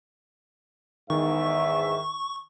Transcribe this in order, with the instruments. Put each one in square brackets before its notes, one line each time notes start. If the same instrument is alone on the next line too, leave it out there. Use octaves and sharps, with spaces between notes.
[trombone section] E2 G#2 [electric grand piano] D#3 [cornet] E5 [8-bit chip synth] C#6